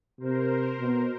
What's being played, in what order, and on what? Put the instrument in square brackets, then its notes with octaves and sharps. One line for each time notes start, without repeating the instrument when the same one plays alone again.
[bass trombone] C3 [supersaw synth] A#4 C5
[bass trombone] B2